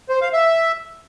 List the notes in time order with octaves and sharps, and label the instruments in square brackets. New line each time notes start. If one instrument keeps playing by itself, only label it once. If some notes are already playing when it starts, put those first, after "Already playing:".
[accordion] C5
F5
E5